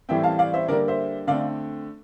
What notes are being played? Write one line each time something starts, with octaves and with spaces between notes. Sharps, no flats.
A2 E3 G3 C4 E5 G5
F5 A5
D5 F5
C5 E5
D3 G3 A#3 A#4 D5
C5 E5
D3 A3 C4 D5 F5